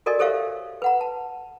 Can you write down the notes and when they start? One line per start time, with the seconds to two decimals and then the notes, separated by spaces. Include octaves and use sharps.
0.06 F#4 A4 A#4 D5 D#5 G#5
0.19 G4 A4 C5 C#5 E5 F5
0.82 B4 F#5 A#5
1.01 A5